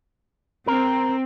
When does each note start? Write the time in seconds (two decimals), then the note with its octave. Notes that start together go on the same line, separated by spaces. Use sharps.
0.67 C4 A#4